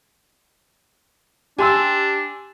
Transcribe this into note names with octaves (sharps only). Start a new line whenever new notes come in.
D4 G4 G#5 C6 E6